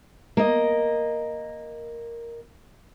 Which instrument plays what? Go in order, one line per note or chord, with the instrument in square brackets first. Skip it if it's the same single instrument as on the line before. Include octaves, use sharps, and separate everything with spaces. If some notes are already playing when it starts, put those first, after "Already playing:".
[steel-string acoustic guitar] A#3 D#5